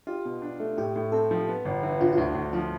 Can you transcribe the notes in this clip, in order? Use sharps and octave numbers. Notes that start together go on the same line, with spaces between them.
F4 G4
B2
D4
A3
A2 G4
A2
C4 A4
F3
B3
G1
E3
G2 F4
F4
D2 E4
D2
F3 F4